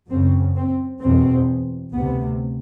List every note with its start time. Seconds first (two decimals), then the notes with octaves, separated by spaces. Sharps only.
0.10 F#2 C#3 C4
0.56 C4
1.02 E2 B2 C4
1.94 D2 C3 B3